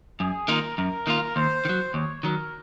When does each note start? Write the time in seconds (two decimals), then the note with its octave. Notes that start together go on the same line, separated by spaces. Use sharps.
0.20 F#2 G#4
0.48 D#3 A#3 F4 A#4
0.78 F#2 A#4
1.07 D#3 A#3 F4
1.36 D#2 C5
1.65 D#3
1.69 F#3
1.94 D#2 C#5
2.23 D#3 F#3 A#4